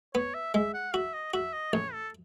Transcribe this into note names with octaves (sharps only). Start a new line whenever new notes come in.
B3 C#5
E5
G#3 E5
F#5
F#4 E5
D#5
F#4 E5
D#5
A1 C#5
A4